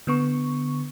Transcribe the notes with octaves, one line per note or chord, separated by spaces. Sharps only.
D3 B3 C#6